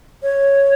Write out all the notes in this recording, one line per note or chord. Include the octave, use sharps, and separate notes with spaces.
C#5